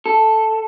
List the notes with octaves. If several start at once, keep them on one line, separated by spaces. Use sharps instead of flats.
A4